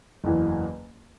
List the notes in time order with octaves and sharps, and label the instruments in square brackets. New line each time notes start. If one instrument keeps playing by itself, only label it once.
[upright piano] F#1 E2 E3